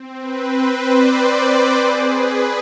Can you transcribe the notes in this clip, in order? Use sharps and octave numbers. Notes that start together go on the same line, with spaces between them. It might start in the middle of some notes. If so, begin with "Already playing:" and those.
Already playing: C4
B4
C5
D5
B4
G#4
B4